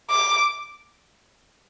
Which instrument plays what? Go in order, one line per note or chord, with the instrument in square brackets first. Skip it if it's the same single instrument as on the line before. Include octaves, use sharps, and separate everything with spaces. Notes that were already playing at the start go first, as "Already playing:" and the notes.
[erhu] D6